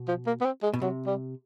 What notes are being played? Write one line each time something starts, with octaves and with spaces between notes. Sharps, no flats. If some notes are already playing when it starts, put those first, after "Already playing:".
Already playing: B2
F3
A#3
B3
C4
G#3
B2
C3 F#3
G3